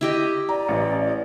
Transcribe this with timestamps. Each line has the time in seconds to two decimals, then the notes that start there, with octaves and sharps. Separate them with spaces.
0.01 E4 G4 D#5
0.49 D5 A#5
0.69 A1